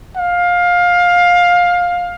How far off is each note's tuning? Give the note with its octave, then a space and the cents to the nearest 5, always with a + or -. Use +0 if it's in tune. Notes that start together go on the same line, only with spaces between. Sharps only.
F5 +20